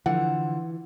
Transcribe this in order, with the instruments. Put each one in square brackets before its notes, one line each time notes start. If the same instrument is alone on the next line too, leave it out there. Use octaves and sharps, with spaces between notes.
[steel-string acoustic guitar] D3 F3 [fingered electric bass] E3 [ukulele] F#5